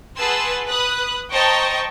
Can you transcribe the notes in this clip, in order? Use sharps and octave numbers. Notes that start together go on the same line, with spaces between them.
G#4 B4 F#5 A5 C6 E6
B4 D#6 F#6
C5 D#5 G5 A5 A#5 C#6